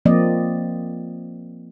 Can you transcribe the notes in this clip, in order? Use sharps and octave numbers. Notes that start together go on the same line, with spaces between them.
F3 A#3 C4 D5 D#5